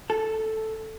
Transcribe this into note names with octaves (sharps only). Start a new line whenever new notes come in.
A4